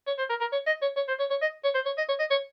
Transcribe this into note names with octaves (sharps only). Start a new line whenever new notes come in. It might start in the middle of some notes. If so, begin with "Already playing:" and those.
C#5
C5
A#4
A#4
C#5
D#5
C#5
C#5
C5
C#5
C#5
D#5
C#5
C5
C#5
D#5
C#5
D#5
C#5